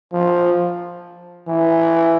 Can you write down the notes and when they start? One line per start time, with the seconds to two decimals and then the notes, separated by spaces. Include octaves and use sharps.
0.13 F3
1.48 E3